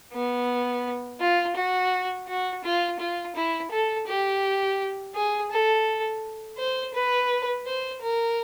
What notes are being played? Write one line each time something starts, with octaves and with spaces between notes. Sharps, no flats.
B3
F4
F#4
F#4
F4
F4
E4
A4
G4
G#4
A4
C5
B4
C5
A#4